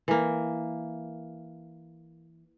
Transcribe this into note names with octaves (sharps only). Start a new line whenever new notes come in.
E3 A#3